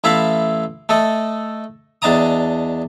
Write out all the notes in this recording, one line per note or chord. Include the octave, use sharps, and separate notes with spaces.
A1 E4 E5 F5 A5 B5
A3 A4 D#5
E2 D4 D#5 A5 A#5 D#6